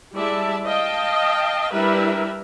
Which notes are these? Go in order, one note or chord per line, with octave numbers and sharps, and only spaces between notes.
G3 G#3 E4 D5 E5 A5
D#5 F5 G5 A5
G3 D4 E4 A#4 B4 E5